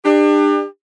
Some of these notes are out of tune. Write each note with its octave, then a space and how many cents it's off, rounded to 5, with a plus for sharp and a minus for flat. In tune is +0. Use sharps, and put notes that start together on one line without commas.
D4 +35 G4 +35